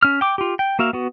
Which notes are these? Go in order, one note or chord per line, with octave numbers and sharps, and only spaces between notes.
C#4 F6
G5 D6
F4 G4
G5
A#3 F#4 E5 F5
B3 F#4